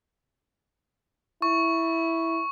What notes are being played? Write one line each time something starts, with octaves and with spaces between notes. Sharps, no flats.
E4 C#6